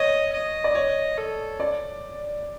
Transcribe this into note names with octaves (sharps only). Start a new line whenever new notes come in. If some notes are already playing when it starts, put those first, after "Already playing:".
Already playing: C#5 D#5
D#5
D5
C#5
A4
D5